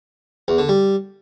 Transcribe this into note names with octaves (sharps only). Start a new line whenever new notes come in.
E2
D3
G3